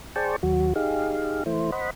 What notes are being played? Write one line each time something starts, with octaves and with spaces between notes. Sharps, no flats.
G#4 C5 D5 G5 A5 C#6
D#2 F#3 F#4
D#4 G4 G#4 F5
E3 A3 E4 C5
C5 D#5 F#5 B5